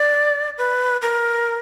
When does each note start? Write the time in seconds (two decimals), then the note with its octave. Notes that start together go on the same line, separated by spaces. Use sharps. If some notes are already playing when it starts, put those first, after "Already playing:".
Already playing: D5
0.58 B4
1.02 A#4